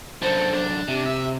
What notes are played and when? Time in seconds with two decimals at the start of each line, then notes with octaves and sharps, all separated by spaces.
0.22 F#2 D3 A4 B4 C5
0.54 D4
0.88 C3 G4
1.06 E5